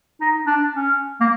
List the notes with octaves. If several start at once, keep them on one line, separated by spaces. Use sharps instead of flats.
D#4
D4
C#4
A#3